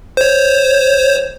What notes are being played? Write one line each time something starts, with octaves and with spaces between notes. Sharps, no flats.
C5 C#5